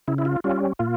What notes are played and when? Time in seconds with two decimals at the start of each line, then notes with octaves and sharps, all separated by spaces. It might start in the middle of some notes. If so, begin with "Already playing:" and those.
0.08 C#3 E4
0.18 E4
0.25 F4
0.44 G3 C#4 F4
0.79 A#2 F4